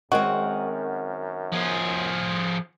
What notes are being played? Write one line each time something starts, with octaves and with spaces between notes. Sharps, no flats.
F#2 D#3 G#3 C4 F#4
F3 G#4